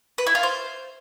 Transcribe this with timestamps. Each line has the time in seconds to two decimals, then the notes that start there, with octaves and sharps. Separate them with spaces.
0.18 B4
0.27 E4
0.35 F4
0.43 C5